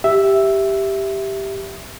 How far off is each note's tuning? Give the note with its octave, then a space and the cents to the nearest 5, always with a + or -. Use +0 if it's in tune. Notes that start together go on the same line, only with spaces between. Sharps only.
G4 +0 E5 +0